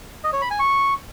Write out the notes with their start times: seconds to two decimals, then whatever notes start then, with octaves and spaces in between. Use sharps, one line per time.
0.24 D#5
0.33 C#5
0.42 B5
0.51 G#5
0.59 C#6